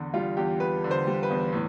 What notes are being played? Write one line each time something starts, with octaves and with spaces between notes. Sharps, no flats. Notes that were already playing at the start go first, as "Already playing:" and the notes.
Already playing: E2 D3
G3 F4
E2 G4
E2 B4
D3
C5
G3
B4
E2
A2